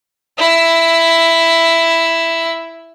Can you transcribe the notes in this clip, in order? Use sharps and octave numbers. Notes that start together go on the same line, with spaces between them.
E4 E6